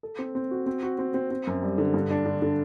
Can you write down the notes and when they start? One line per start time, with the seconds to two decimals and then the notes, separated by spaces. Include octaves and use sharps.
0.03 A4
0.19 C4
0.35 C4
0.51 F#4
0.66 C4
0.83 F#4
0.99 C4
1.14 C4
1.31 C4
1.47 F#2
1.63 G3
1.78 D3
1.94 G2
2.10 D4
2.26 D3
2.42 D3